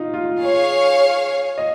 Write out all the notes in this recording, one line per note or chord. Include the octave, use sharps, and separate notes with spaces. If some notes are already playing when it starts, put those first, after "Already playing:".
Already playing: D#4 F4
F4
G#4 C#5 F5
D#5